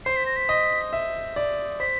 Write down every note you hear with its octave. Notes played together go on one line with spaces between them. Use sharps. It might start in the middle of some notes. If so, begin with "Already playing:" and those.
C5 C7
B6
A#6
B6
D#5
E5
D5
C5 B6